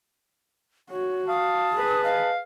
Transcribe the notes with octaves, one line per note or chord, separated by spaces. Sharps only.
F#4 C#5
F5 A5 D#6
G#4 B4
D#5 F5